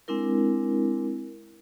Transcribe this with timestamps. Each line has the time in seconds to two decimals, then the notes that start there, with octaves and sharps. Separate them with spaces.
0.08 G#3 C4 D4 E4 A#4